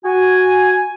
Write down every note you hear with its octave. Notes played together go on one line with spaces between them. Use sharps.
F#4 G#5